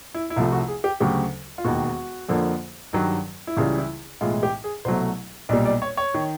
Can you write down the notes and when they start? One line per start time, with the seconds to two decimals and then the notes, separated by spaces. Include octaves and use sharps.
0.14 E4
0.30 E4
0.36 C2 C3 F3 A3 F4
0.52 F#4
0.68 G#4
0.84 G4
1.00 D2 C#3 F#3 G4
1.58 F4
1.65 E1 D#2 D#3 F#4
2.29 F2 D3 F3 A#3
2.93 G2 D#3 F#3
3.47 E4
3.57 C#2 C#3 E3 G3 F4
3.78 E4
4.21 B1 A2 E3 G#3 F4
4.43 G4
4.64 G#4
4.85 C2 B2 F#3 A3 C5
5.49 B1 A#2 G3 D5
5.65 D5
5.82 C#5
5.97 C#5
6.14 D#3